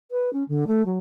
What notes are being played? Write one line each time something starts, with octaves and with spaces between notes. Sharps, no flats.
B4
C#4
D3
A3
F#3